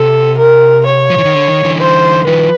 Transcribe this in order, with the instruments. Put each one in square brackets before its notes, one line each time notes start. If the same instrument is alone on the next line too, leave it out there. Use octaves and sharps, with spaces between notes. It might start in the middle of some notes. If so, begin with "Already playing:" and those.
Already playing: [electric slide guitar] C3 [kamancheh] A4
[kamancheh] A#4
C#5
[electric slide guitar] F3
E3
D#3
D3
D#3
D3 E3
[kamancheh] C5
[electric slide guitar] D#3 F3 [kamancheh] B4